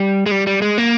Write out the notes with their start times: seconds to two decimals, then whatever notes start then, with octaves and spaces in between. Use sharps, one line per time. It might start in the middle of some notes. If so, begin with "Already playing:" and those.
Already playing: G3
0.26 G#3
0.31 G3
0.47 G3
0.62 G#3
0.78 A#3